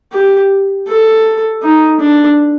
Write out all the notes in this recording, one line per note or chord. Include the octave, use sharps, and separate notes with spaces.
G4
A4
D#4
D4